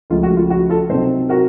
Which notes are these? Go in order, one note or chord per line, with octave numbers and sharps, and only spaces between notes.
C#2 C#3 F3 A3 F4
F#4
F4
F#4
F4 A4
C3 F#3 C4 D#4 A4 C5
F#4 A#4